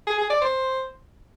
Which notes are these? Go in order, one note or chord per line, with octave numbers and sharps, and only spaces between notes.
G#4
G#4
D5
C5